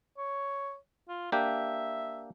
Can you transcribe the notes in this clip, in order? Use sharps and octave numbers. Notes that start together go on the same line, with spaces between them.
C#5
F4
A#3 D4 G4 E5